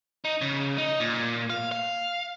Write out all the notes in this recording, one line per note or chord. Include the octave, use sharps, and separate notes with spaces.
D#4
C#3
D#4
A#2
F5
F5